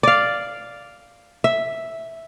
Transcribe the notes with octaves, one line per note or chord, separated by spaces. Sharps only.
D5 F5
E5